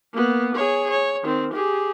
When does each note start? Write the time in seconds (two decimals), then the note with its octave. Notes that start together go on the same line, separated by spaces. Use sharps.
0.13 A#3 B3
0.55 G#4 C#5
0.90 C#5
1.24 D#3 C4
1.53 G4 G#4